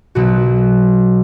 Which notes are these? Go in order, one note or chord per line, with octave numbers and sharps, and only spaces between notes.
B1 B2 F#4